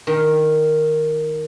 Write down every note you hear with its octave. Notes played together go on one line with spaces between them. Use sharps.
D#3